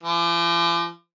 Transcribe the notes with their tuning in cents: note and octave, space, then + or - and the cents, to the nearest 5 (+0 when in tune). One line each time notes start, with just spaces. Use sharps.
F3 -45